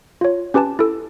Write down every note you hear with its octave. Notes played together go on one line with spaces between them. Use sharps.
F4 C#5
C#4 G4 B4 G#5 A5
E4 A4